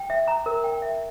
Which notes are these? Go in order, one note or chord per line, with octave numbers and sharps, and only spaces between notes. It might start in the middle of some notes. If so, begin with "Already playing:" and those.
Already playing: G5
E5
A#5
A#4
G5
E5